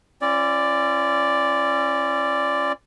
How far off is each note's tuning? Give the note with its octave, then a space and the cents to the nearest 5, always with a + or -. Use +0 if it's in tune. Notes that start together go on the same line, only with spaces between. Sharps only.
C#4 -25 F4 -45 D5 +0